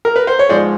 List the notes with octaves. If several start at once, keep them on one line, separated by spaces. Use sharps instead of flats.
A#4
B4
C5
C#5
G#2 F3 G#3 C5 D5